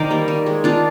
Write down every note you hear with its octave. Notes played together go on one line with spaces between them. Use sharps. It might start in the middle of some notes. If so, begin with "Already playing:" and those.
Already playing: D#3 A#4 C5 D5
G3 A#3
D#3
G#3
D#3 D4 F4